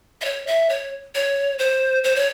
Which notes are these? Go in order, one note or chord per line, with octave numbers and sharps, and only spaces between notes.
E5
C#5
E5
C#5
C#5
C5
C5
C#5